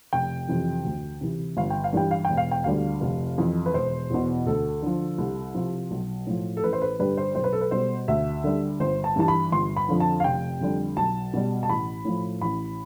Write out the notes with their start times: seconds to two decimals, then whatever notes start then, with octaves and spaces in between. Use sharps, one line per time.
0.13 F1 G5
0.49 F2 C3 E3
0.85 D2
1.21 C3 E3
1.57 G1 F5
1.70 G5
1.84 F5
1.93 G2 E3 G3 G5
2.11 F5
2.25 E1 G5
2.37 F5
2.51 G5
2.64 D2 D3 G3 F5
3.01 F1
3.38 F2 E3
3.66 B4
3.74 E1 C5
4.10 E2 B2
4.46 D2 A4
4.83 D3 F3
5.18 C2
5.55 C3 F3
5.91 B1
6.27 A2 F3
6.57 A4
6.63 A1 B4
6.73 C5
6.82 B4
6.99 G2 D3 G3 B4
7.17 C5
7.35 B1 C5
7.44 B4
7.53 A4
7.61 B4
7.71 B2 G3 C5
8.08 D2 E5
8.44 D3 G3
8.80 G1 C5
9.04 A5
9.16 G2 E3 A5
9.28 B5
9.52 G1 C6
9.77 B5
9.89 F2 D3 F3
10.00 A5
10.20 F5
10.24 F1 G5
10.61 F2 D3 G3
10.97 B1 A5
11.33 B2 G3
11.63 A5
11.69 A1 B5
12.05 A2 F3
12.41 A1 B5